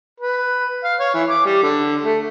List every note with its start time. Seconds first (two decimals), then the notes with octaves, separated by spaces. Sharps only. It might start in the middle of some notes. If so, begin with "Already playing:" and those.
0.20 B4
0.84 F5
1.00 C#5
1.14 E3
1.29 D6
1.45 G3
1.63 D3
2.03 A3